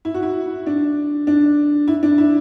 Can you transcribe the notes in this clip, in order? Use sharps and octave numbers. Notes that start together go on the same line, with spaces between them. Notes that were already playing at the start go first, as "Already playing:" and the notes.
E4
F#4
E4
D4
D4
E4
D4
E4